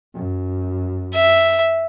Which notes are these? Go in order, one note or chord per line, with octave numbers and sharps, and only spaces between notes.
F#2
E5